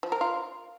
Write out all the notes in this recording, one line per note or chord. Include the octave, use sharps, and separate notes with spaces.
F3
A#4
F4